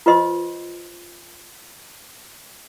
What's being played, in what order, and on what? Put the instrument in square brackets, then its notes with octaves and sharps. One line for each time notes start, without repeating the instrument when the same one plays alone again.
[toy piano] F4 B4 C5 D#5 C6